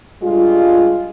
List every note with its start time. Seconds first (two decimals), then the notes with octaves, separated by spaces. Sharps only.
0.22 G2 G3 G#3 F4